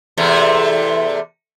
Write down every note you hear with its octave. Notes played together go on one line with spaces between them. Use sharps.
E2 C3 A3